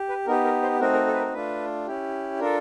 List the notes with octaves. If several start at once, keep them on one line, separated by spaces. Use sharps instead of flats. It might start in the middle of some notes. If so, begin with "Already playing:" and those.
Already playing: G4
B4
B3 D#4 G4 A#4
A#4
C5
A3 C4 D#4 F#4 A#4
A#4
A4
B4
A#4
A3 D4 F4 B4
C#4 E4 G4
D4 F4 A4 A#4